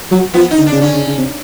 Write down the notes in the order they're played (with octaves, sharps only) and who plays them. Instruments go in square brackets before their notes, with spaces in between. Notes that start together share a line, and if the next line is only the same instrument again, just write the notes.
[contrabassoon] F#3
[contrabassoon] F3 [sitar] B3
[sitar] D#4
[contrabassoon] D3
[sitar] D4
[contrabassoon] C#3
[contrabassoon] D3 [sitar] C#4
[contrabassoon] C#3
C#3
C3